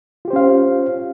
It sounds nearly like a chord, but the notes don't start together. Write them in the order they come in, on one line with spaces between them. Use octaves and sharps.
F4 G4 C5 C#4 F5